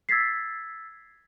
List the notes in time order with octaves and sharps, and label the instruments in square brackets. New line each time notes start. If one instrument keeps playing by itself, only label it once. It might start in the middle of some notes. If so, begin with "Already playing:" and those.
[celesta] E6 G#6 A6 B6 C7